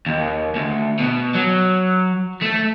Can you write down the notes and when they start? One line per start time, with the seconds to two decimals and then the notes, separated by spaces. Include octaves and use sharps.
0.06 D#2
0.56 D2
0.99 B2
1.35 F#3
2.42 A3